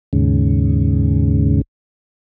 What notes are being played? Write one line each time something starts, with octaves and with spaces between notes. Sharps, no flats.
D#2 G#2 C#3